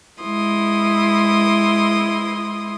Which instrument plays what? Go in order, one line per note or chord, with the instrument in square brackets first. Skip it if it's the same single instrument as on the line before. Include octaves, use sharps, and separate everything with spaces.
[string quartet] G#3 E4 C6 D#6